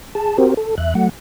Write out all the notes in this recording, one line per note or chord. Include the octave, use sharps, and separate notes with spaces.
G#4 A5
C4 F#4 G4 A#4 C5
A4
E2 E5 F#6
F#3 A3 F#5